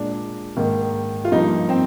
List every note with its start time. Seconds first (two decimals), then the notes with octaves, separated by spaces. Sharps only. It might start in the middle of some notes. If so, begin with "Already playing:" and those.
Already playing: A#2 G#3 D4
0.57 G#2 D#3 A#3
1.25 F4
1.31 G2 F3 A#3 D#4
1.69 C4